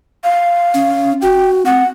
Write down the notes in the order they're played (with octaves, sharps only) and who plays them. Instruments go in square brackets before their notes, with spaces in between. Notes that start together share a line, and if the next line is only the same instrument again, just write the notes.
[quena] F5
[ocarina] C#4
[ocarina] F#4 [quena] G5
[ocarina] C4 [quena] F#5